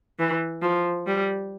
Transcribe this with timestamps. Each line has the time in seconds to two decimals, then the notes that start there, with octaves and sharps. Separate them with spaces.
0.19 E3
0.62 F3
1.07 G3